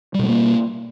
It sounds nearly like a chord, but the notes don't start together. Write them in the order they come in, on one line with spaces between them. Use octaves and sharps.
G3 B2 G#3 A#3